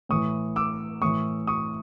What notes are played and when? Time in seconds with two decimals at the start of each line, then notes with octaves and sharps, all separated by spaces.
0.09 A2 E3 C#6 D#6
0.56 D6 E6
1.02 A2 E3 C#6 D#6
1.47 C#6 D#6